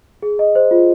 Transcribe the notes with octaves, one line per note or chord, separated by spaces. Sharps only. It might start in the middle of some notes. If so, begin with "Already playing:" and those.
G#4
D#5
C5
F4